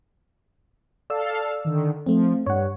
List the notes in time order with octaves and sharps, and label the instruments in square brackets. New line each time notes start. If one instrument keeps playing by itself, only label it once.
[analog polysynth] A4 F5 [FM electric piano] D5 E6
[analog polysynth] D3 D#3
[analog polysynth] F3 [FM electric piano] A3 C4
[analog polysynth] G2 [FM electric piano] C#5 F#5